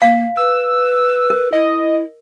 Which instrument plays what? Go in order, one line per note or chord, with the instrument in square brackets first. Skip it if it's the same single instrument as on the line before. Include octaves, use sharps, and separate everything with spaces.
[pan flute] A#3 [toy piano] F5
[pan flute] B4 [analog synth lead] E6
[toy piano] A#4
[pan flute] E4 [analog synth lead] D#5